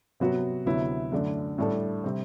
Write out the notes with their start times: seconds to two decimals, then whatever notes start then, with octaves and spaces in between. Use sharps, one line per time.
0.20 C3 F#3 B3 F#4
0.66 D2 C3 F#3 B3 E4
1.12 F#2 D3 A3 D4
1.58 A2 G3 D4 A4
2.04 C3 G3 C4